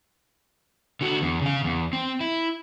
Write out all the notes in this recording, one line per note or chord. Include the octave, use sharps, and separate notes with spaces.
D3 F#4
E2
C#3 F5
E2
C4
E4